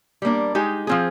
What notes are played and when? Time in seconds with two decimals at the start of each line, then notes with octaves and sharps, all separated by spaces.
0.22 G3 A#3 D4
0.55 G#3 D#4 G4
0.87 F3 C4 F4 G#4